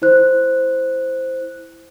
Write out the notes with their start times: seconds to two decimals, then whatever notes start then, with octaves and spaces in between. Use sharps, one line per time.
0.02 E4 C5 F#6